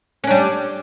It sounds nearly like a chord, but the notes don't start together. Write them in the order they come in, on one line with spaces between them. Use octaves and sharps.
C#4 D4 G3